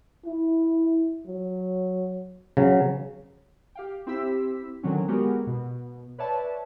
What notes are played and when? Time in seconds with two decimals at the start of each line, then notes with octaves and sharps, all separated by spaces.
0.25 E4
1.27 F#3
2.57 C#3 F#3
3.75 G4 F5 G5
4.07 C4 E4 G4 E6 B6
4.83 D3 D#3 F#3 C4 C#4
5.08 G#3 B3 F#4 G4 A#4
5.47 B2
6.18 B4 C#5 D5 E5 A5